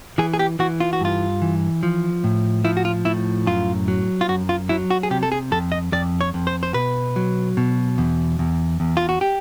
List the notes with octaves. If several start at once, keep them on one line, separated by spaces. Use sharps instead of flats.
E3 G#4
G#4
G4
E3 F#4
F4
F#4
G2 F4
E3
F3
A2
F3 E4
F#4
F4
A2 E4
F#2 F4
F#3
F4
F#2 F#4
F4
F#3 E4
F#4
G#4
C3 G4
A4
G#4
F2 A4
D#5
F2 D5
C#5
F2
C5
C5
B2 B4
F#3
B2
E2
E2
E2
F4
F#4
G4